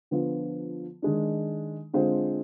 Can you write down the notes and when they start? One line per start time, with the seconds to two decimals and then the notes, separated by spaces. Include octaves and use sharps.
0.11 D3 F3 B3 F4
1.02 D#3 G#3 D4
1.94 D3 G#3 C4 F4 C5